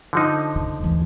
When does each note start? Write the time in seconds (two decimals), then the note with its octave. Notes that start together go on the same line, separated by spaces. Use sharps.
0.13 D3 F3 D#4
0.55 C#3
0.80 D#2 E3